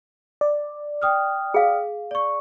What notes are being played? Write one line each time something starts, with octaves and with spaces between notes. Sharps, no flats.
D5
G5 D#6 F6
G#4 F5
D5 C#6